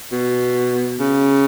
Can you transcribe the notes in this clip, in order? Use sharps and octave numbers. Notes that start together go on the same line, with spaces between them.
B2
C#3